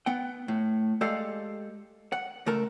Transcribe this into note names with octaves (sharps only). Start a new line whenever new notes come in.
B3 F#5 G5
A2
G#3 G4 A4 D5 D#5 F5
F#5
C#2 A3 A4 A#4 A5